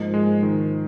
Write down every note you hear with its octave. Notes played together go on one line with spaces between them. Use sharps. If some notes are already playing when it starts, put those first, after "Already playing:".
Already playing: G#2 F3 A#3 D#4
G#3
D#3